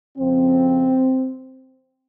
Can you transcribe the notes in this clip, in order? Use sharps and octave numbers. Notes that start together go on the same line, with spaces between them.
F2 C#3 F3 C4